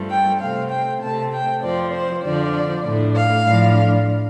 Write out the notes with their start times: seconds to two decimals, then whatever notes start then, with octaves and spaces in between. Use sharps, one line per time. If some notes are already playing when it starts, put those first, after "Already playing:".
Already playing: G2 F3 A3
0.10 G5
0.40 C3 A3 C4 F5
0.70 G5
1.01 C3 A3 C4 A5
1.32 G5
1.63 F2 F3 C4 D5
1.93 C5
2.23 F2 D3 F3 D4 D5
2.85 A2 A3 D4
3.16 F5
3.46 A2 F3 D4